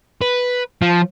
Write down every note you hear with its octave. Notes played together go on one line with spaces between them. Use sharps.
B4
F3